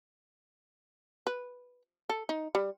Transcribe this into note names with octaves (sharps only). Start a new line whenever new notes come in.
B4
A4
D#4
G3